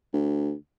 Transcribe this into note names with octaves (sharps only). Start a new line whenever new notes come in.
D2